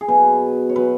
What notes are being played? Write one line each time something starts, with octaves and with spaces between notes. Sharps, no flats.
G#4
B2 F#3 B4
C#5
B2 F#3 B4